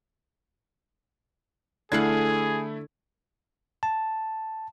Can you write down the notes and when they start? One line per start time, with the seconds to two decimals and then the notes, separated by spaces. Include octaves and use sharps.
1.92 D3 A3 E4 G#4 F5 F#5 G#6
3.83 A5